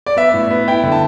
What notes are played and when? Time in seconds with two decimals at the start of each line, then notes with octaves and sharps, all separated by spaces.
0.06 D5
0.17 B3 E5
0.34 A2
0.51 B3
0.68 E4 G5
0.83 D3
0.92 A5